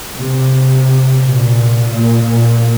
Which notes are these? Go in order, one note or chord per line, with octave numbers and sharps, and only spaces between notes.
C3
A#2
A#2
A#2